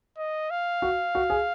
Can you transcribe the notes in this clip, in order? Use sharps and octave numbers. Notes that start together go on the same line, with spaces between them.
D#5
F5
F#4
F#4
G#4